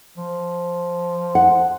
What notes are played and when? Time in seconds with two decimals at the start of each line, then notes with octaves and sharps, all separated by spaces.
0.18 F3
1.35 F#5